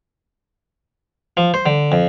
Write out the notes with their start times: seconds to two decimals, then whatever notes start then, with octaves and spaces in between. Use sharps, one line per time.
1.37 F3
1.54 C5
1.66 D3
1.92 F2